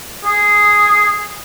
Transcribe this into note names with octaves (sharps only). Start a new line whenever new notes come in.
G#4